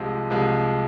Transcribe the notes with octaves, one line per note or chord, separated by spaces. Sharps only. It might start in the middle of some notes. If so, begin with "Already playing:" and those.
Already playing: C2 C3 F3 G#3
C2 C3 F3 G#3